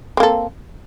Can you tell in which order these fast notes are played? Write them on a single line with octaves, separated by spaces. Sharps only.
C4 A#3 A4